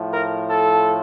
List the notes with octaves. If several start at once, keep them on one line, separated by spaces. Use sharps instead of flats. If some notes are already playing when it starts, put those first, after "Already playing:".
Already playing: A2 F3
A#4
A4